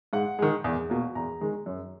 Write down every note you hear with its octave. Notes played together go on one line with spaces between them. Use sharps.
G#2 F#5
D#3 G#3
E2
B2 A#3
E2 A#5
D#3 G#3
F#2